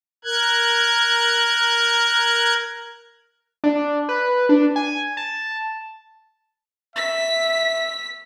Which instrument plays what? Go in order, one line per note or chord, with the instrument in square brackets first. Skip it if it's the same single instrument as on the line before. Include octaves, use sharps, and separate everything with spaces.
[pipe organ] A#4 F#6 G#6
[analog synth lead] D4
B4
D4
G#5
A5
[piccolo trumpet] E5 [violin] B6